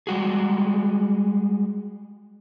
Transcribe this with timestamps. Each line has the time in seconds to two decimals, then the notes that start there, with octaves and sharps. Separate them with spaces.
0.07 G3 G#3 F#4 G#4